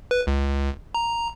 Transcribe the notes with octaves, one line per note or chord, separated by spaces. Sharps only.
B4
C#2
A#5